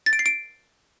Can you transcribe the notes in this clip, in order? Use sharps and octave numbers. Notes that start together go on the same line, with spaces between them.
A6
D7
C7
D7